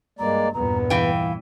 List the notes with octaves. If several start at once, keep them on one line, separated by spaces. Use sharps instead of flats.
G2 G#3 A#3 D5 A#5
E2 G2 A#2 B3 A#5
E3 F5 G5